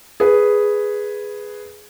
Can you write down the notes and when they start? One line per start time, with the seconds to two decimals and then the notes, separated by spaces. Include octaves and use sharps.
0.20 G#4 B4